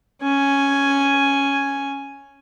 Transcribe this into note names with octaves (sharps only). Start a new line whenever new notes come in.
C#4 G#5